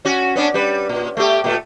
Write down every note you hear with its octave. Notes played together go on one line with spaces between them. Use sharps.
C#4 F#4
B3 C#4 D4
G3 B4
A#2
A3 B3 G4
A#2 A3